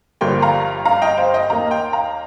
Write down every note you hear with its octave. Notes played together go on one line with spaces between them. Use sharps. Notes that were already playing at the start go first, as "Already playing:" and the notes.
G1 G2 F3 A#3 G5 C6
F5 A#5
F5 A#5
D#5 G5
C5 F5
D#5 G5
D#2 D#3 A#3 D#4 F5 A#5
G5 C6
F5 A#5